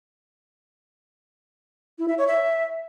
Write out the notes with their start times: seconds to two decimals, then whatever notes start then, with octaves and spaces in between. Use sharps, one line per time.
1.99 E4
2.08 E5
2.18 C#5
2.28 E5